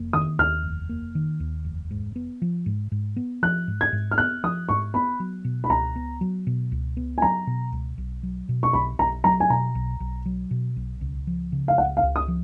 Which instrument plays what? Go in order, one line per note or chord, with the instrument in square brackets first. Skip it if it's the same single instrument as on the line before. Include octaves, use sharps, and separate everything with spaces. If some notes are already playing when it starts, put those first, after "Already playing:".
Already playing: [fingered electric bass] F1 A#3
[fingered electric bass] D#3 [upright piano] D#6
[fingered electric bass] D#2 [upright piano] F6
[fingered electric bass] F1
A#3
D#3
D#2
F1
G#2
B3
F3
G#2
G#2
B3
[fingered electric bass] F3 [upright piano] F#6
[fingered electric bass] G#2
[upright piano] G#6
[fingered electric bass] G#2
[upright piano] F6
[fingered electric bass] B3 [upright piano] F#6
[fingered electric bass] F3 [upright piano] D#6
[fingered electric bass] G#2 [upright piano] C#6
[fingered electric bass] B3 [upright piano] B5
[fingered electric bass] F#3
B2
[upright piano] B5
[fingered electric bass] C#2 [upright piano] A#5
[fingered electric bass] B3
F#3
B2
C#2
B3
[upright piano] G#5
[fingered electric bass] F#3 [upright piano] A#5
[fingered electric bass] B2
C#2
B1
F#3
B2
[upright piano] C#6
[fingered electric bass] B1 [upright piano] B5
[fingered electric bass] B1 [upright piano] A#5
[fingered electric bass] F#3 [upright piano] A#5
[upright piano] G#5
[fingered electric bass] B2 [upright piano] A#5
[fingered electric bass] B1
B1
F#3
B2
B1
C#2
F3
C#3
[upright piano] F5
[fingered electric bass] C#2 [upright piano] F#5
[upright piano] F5
[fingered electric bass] C#2
[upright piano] D#6
[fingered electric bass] F3